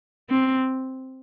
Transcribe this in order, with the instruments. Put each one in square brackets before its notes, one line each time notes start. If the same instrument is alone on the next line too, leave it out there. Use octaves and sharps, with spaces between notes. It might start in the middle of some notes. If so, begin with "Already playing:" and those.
[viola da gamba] C4